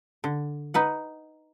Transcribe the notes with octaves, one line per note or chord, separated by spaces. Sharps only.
D3
D#4 B4 F#5